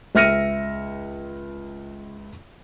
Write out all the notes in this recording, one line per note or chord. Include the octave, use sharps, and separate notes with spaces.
C#2 E5 F6 A#6 C#7 D#7